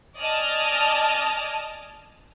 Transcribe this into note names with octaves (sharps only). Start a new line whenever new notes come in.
D5 D#5 G#5 A5 D#6 F6